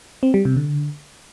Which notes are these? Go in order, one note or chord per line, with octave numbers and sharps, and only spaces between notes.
C4
G3
C3
D3